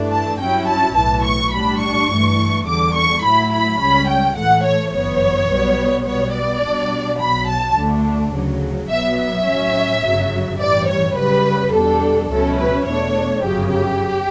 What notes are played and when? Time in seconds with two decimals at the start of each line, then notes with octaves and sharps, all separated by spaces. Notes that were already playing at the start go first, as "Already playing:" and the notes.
Already playing: G2 E3 A3 D4
0.11 A5
0.40 G2 F#3 C#4 E4 G5
0.68 A5
0.96 B1 A2 E3 A5
1.25 C#6
1.53 A2 G3 D4 B5
1.81 C#6
2.10 G2 E3 A3
2.66 E2 D3 G3 D6
2.94 C#6
3.23 A2 F#3 A3 E4 B5
3.51 B5
3.80 C#2 C#3 G3 C#4 B5
4.08 G5
4.37 A2 E3 A3 F#5
4.65 C#5
4.93 G1 F#2 E3 B3 C#5
5.50 B1 B2 G3 B3
6.07 B2 G3 B3 C#5
6.35 D5
6.63 B2 G3 D4
7.20 B1 B2 F#3 B5
7.48 A5
7.77 D2 D3 A3 D4
8.33 D2 C#3 F#3
8.90 B1 B2 F#3 B3 E5
9.19 E5
9.46 A2 F#3 C#4
10.03 G1 F#2 C#3 F#3
10.61 A1 G2 E3 G3 D5
10.88 C#5
11.17 F#2 C#3 G3 B4
11.73 E2 B2 G3 D4 A4
12.30 C#2 B2 F#3 C#4 E4 A4
12.58 B4
12.87 E2 B2 A3 D4 C#5
13.43 G1 F#2 C#3 F#3 G4
13.72 G4